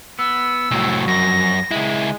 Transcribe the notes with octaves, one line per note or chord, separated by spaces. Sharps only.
B3 E6
C2 F2 A2 F#3 F#4
F#2 A#6
C#2 G#3 E4